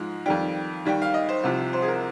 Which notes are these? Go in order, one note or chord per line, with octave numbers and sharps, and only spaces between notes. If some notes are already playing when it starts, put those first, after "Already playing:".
Already playing: G#2 F3 G#3
F2 D#3 G3 G5
D#2 D#3 G3 G5
F5
D#5
C5
C2 C3 F3
C5
G#4
A#4